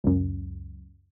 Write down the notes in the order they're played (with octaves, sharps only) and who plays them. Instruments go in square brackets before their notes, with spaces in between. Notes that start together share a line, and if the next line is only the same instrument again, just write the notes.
[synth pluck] C#2 F#2